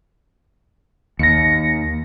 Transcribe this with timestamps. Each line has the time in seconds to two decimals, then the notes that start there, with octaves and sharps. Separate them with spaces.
1.19 D#2 A#6 C#7